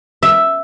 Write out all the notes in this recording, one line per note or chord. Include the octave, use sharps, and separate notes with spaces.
E5